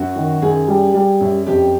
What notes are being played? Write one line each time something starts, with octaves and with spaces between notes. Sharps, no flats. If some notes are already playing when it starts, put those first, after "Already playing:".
Already playing: F#2 F#4
D#3
F#2 G#4
G3
G3
F#2
F2 G4